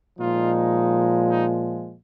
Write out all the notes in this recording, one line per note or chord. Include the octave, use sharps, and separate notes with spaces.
A#2 F3 G#3 D#4 F4
D#4